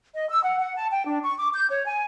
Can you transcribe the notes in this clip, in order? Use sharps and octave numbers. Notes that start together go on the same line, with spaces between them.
D#5
E6
F#5
F#5
A5
G5
D4
C#6
D6
G6
C#5
G#5